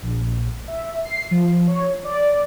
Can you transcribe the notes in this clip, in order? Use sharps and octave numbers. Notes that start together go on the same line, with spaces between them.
A#1
E5
C7
F3
C#5
D5